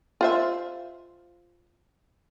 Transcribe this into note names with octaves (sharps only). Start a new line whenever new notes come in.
F4 C5 E5